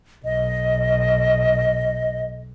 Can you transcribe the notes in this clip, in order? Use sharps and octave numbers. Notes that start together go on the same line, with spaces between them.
B1 D#5